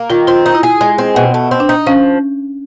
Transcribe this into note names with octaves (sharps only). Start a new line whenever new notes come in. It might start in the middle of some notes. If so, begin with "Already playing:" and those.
Already playing: A#3
D#3 F4
C4 F4
D#4
E4
G#4
G#3
C4
B2
A3
C4
D4
D#4
F3 C#4